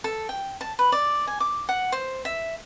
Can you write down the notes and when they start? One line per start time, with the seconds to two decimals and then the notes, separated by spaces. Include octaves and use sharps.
0.04 A4
0.29 G5
0.61 A5
0.79 B4
0.92 D5
1.27 G#5
1.40 D6
1.69 F#5
1.92 C5
2.25 E5